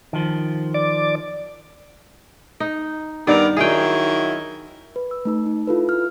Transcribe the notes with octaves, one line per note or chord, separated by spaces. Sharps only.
D#3 F3
D5 D6
D#4
G2 D#3 B3 A#4 D5
D#3 F#3 E4 G#4 G5
B4
E6
A3 D#4 E6
D#4
E4 F4 A4 B4
F6